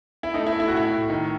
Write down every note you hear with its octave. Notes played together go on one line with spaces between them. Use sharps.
E4
A3 D#4
E4
A3
E4
F#4
A2
E4
A2
D#3